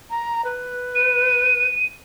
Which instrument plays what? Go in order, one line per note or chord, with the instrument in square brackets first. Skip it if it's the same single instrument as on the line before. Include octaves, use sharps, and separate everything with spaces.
[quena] A#5
B4
[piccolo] D#7